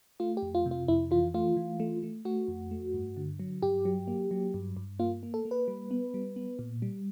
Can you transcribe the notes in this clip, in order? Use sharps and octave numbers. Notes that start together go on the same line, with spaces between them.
A3 F4
G4
F2
F4
C3
F4
F2 E4
E3 F4
A3 F4
E3
A3
A3
A3 F#4
F2
A3
G2
D3
F#3
G2 G4
F#3
A#3
F#3
G2
G2
A#3 F4
A#3
A4
A#3
B4
G3
B3
G3
B3
A#2
G3